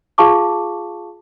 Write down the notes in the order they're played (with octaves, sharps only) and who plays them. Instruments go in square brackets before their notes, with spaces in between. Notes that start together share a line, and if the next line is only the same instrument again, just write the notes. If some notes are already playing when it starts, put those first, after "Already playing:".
[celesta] F4 G#4 F5 A5 C#6 D6